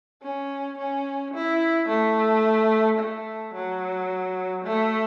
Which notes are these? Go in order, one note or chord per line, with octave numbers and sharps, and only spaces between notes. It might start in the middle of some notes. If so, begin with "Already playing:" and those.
C#4
C#4
E4
A3
A3
F#3
A3